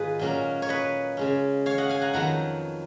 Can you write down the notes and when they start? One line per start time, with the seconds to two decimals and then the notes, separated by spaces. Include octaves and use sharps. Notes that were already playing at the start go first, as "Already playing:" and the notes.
Already playing: G#2 D#3 D#4 F4 G#4 B4 D#5
0.19 A#2 F#3 A#3 C#4
0.62 C#5
0.69 B4 D#5
1.17 C#3 G#3 C#4
1.66 C#5 F5
1.78 D#5 F#5
1.89 F5 G#5
2.02 F#5 A#5
2.13 F2 D#3 F#3 B3 F#5 A#5